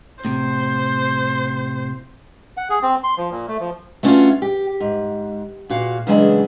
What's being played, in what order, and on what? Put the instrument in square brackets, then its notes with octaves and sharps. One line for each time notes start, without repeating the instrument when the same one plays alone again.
[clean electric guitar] A2 C3 [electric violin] C5
[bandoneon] F#5
G#4
C4
C6
F3
A#2
A3
F3
[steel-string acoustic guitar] A3 B3 C#4 D4 F4 F#4
G4
G#2
A#2 F#4 F5
C#3 E3 F#3 G#3 D4 G#4